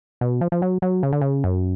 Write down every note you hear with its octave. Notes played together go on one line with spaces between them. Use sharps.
B2
F3
F3
F#3
F#3
C#3
D3
C#3
F#2